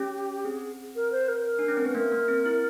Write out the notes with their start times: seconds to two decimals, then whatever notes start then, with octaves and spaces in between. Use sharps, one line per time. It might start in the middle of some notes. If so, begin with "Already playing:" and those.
Already playing: C#4 G4
0.44 C4 G#4
0.96 A#4
1.12 C5
1.28 A#4
1.59 D4
1.68 C#4
1.77 C4
1.85 B3 B4
1.95 A#3 A#4
2.12 A#3
2.28 C4
2.46 E4